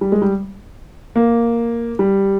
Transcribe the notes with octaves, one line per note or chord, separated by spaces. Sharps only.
G3
G#3
G3
A#3
G3